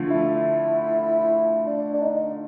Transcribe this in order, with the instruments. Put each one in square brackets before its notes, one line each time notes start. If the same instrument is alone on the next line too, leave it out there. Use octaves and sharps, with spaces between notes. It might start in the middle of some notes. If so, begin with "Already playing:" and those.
Already playing: [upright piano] D3 F3 A3
[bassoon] E4
D4
D4
D#4